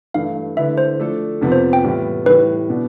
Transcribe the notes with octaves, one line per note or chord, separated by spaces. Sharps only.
G2 E3 A3 E4 F5
D3 A3 E4 B4 E5
C5
F3 A3 D4 A4
F2 C3 F3 B3
C5
G5
A2 E3 G3 B3 F4
A2 E3 G3 B4
B2 B3 D4